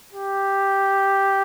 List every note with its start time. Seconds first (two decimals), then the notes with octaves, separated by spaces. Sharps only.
0.13 G4